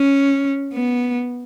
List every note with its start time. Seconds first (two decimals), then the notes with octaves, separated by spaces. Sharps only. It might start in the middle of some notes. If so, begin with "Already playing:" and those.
Already playing: C#4
0.73 B3